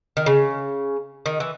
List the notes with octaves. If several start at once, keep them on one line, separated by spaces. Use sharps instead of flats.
D#3
C#3
D#3
E3